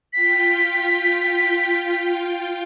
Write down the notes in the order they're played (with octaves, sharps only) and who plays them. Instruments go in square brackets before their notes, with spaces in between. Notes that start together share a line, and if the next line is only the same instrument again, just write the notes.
[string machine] F4 G5 [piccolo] B6